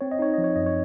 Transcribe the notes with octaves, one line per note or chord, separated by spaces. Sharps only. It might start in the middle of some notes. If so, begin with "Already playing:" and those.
C4 C#5
D#5
D#4 C#5
F3 D#5
C#5
F#2 D#5
C#5